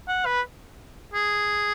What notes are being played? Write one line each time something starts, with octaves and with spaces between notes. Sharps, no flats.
F#5
B4
G#4